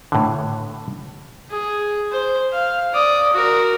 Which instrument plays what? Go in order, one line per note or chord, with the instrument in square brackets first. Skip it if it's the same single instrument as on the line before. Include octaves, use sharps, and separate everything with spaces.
[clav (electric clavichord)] A2 D3
[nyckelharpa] G#4
C5
F5
D5 D#6
F#4 A#4